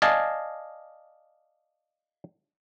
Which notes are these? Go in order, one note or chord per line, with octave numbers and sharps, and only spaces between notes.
D5 D#5 F5 G#5 A5